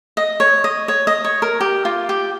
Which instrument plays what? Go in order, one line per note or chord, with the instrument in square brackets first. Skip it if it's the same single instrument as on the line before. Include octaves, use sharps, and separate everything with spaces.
[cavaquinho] D#5
C#5
D#5
C#5
D#5
C#5
A#4
G4
F4
G4